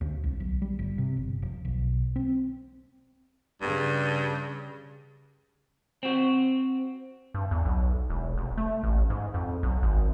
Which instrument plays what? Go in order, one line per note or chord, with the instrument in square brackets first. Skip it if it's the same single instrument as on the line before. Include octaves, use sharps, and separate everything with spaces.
[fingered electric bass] D2
C2
B1
G3
G1
C3
G1
F1
B1
C4
[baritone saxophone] G2 [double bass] C#3
[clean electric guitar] C4 F#4
[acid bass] G2
E2
B1
E1
F1
A3
A1
G#2
F2
B1
G#1